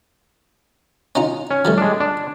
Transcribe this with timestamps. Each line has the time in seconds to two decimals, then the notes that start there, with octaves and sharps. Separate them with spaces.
1.15 C#4 D#4 F4
1.51 C#4
1.65 F3 G3 A3
1.78 G#3 D4
2.00 D4